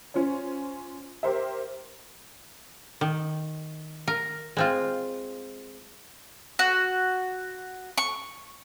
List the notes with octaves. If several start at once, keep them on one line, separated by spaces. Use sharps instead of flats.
C#4 F4 C5 C#5
G4 A#4 C5 E5
D#3
A#4
G#3 C4 F4
F#4
C#6